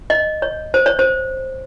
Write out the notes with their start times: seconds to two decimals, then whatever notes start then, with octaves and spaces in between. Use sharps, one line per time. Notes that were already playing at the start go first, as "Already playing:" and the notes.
0.10 D#5
0.42 C#5
0.74 C5
0.86 C#5
0.99 C5